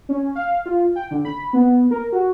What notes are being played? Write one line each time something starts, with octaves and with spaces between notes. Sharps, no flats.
C#4
F5
F4
G5
D3
B5
B3
A#4
F#4